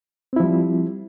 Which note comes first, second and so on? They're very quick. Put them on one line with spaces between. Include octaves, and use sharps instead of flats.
C4 E4 F3 G3